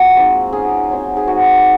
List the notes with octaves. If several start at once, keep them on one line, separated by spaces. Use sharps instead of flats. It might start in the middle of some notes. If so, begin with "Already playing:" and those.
Already playing: A#3 F4 F#4
F3 G#3 C4 D#4
F#3 C#4 F4 G#4
F#3 C4 D#4
G#4
G#3 D#4 F#4